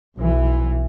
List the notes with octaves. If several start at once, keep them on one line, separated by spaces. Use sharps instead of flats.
B1 E3